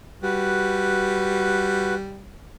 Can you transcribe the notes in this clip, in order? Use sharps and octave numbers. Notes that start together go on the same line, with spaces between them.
G3 F#4 B4